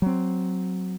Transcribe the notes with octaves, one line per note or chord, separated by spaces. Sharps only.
F#3 C4